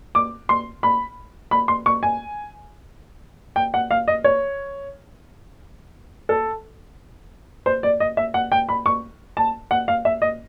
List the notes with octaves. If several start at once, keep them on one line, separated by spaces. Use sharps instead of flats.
D6
C6
B5
B5
C6
C#6
G#5
G5
F#5
F5
D#5
C#5
A4
C5
D5
D#5
E5
F#5
G5
B5
C#6
A5
F#5
F5
E5
D#5